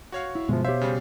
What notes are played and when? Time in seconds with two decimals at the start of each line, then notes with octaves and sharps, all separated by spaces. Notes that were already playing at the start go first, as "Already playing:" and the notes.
0.12 F#4 C#5 F5
0.35 E4
0.49 G1 B2 F3 G#3 E4
0.65 G4 C5 C#5 E5 F5
0.81 C#3 G3